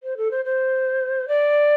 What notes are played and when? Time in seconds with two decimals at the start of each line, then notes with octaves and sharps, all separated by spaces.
0.03 C5
0.17 A4
0.31 C5
0.45 C5
1.28 D5